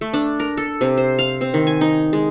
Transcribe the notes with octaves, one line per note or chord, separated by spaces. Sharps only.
A3
D4
A#4
A4
C3
C5
F5
C4
D#3
G#5
D#4
G#3